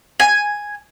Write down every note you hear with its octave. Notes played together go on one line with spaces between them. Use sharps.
G#5